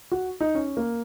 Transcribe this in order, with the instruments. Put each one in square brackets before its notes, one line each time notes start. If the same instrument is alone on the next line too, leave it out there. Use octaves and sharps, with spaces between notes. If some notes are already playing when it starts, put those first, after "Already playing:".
[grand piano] F#4
D#4
C#4
A#3